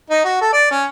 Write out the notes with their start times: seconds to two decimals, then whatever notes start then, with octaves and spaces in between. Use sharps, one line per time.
0.10 D#4
0.24 F#4
0.41 A4
0.53 D5
0.71 C#4